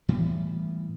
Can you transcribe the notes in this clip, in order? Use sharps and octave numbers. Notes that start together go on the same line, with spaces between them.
A2 E3 G3 B3